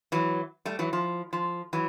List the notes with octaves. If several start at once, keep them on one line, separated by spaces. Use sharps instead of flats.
E3 F#3
G3 A3
E3 F#3
F3
F3
E3 F#3